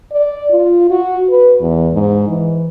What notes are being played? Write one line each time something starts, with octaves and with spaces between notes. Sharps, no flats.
D5
F4
F#4
B4
E2
G#2
E3